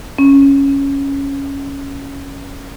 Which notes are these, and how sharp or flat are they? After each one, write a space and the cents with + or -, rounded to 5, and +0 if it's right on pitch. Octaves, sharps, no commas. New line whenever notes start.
C#4 +0